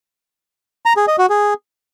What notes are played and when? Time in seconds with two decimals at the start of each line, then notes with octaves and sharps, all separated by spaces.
0.86 A#5
0.97 G#4
1.08 D#5
1.19 F#4
1.30 G#4